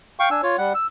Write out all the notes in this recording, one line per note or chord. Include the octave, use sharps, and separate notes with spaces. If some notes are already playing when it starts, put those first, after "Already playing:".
F5 G5 C#6
D4 G#5 E6
F4 C#5
G3 F#5
E6